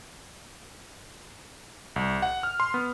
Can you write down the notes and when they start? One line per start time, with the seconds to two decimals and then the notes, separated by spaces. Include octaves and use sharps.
1.96 C2
2.22 F#5
2.43 F6
2.60 C6
2.74 B3